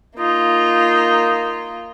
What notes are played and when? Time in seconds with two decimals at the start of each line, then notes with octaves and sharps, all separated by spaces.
0.19 A#3 D#4 F4